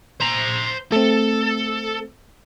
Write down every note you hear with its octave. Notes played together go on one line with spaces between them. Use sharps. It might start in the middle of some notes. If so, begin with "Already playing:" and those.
C5 A#5
A3 C4 A4